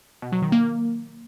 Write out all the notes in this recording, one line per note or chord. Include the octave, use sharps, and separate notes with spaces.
B2
F#3
D#3
A#3